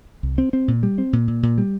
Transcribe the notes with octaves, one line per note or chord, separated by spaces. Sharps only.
C2
C4
C4
A#2
G3
C4
A#2
A#2
A#2
G3